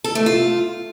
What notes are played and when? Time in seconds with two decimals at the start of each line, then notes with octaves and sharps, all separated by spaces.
0.04 A4
0.15 A3
0.26 F4